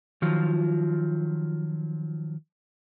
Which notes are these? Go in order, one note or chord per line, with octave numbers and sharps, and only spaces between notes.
D#3 F3 F#3 F4